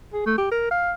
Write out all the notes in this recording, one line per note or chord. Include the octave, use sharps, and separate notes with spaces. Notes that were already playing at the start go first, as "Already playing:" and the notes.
G#4
A3
G4
A#4
F5